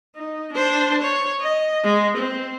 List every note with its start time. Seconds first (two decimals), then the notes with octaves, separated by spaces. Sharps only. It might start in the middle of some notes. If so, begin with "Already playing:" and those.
0.16 D#4
0.53 D4 C5
1.02 C#5
1.41 D#5
1.84 G#3
2.17 C4